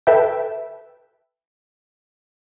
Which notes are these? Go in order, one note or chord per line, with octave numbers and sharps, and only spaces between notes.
A4 B4 E5 G5